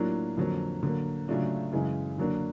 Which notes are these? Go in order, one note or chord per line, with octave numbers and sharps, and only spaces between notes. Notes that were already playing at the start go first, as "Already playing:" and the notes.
Already playing: A2 F#3 A#3 D4 F4
F2 D3 F#3 A#3
D3 F#3 A#3
C#3 F#3 A3 D4 F4
F#2 C#3 E3 G#3
D3 F#3 A#3 D4